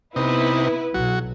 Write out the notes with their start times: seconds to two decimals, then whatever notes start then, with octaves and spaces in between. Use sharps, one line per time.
0.16 C3 B3 D#4 E4 B4
0.94 B1 F#3 F#4